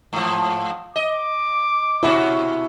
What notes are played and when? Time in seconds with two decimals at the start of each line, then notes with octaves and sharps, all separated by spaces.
0.13 G#2 F3
0.96 D#5 D6
2.03 B2 C#4 E4 F#4